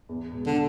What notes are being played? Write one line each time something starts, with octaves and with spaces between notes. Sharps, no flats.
E2
B2 G#3
D3